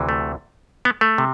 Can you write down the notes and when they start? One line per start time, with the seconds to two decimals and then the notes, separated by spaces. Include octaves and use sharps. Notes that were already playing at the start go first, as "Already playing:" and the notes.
Already playing: D2 C3 E3
0.09 A3
0.85 B3
1.01 A3
1.18 C3